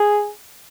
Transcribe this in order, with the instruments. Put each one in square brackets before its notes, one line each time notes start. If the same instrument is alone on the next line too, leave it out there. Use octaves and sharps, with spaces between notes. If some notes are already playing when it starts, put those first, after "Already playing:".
Already playing: [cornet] G#4